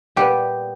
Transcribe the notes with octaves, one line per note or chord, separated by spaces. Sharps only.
A#2 G3 B3 G4